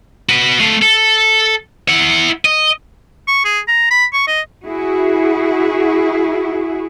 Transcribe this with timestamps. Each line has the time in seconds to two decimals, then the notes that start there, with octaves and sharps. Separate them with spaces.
0.29 F#4 B4
0.60 A3 F5
0.82 A4
1.89 E4 F#5
2.45 D#5
3.28 C#6
3.45 G#4
3.68 A#5
3.91 B5
4.14 C#6
4.27 D#5
4.66 E4 F#4 G#4